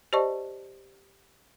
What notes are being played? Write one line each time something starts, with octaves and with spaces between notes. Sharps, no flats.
G4 C5 D5 D#5 A5 C#6